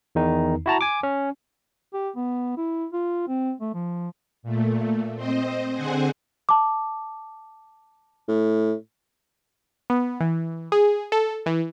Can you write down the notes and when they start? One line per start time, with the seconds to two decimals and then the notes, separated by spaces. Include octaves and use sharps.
0.15 E2 D#3 D#4
0.66 E4 F#4 A5 A#5
0.81 G#5 D6
1.03 C#4
1.94 G4
2.16 B3
2.57 E4
2.93 F4
3.28 C4
3.61 A3
3.74 F3
4.43 A#2 A3
5.14 C4 C5 D#5
5.73 D3 C4 G#4 C5 F#5 G#5
6.49 A5 D6
8.28 A2
9.90 B3
10.20 E3
10.72 G#4
11.12 A4
11.46 E3